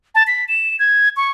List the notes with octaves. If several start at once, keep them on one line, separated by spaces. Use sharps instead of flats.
A5
B6
E7
G#6
C#6